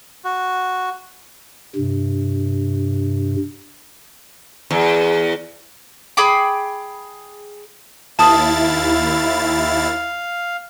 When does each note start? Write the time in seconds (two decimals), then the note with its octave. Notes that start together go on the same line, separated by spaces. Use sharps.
0.24 F#4
1.76 G2 C3
4.71 E2
6.17 G#4 G5 B5 D6
8.19 D#2 E4 F5 A5 D#6 A6